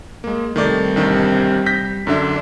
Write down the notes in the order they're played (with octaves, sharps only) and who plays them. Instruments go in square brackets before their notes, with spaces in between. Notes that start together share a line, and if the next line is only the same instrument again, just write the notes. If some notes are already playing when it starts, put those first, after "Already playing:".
[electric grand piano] G#3 A#3
[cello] C3 G3 [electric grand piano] D#3 A3 D5
[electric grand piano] A1 D#3 D4
G6 A#6 B6
[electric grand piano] F#2 D3 E5 [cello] D4